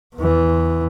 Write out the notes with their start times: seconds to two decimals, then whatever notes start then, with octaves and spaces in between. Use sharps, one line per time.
0.16 E2 E3